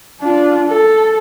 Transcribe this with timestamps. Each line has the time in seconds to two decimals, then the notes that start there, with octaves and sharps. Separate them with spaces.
0.21 D4 F4
0.69 A4